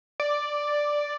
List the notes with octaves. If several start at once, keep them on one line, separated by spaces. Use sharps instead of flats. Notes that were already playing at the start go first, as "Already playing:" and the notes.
D5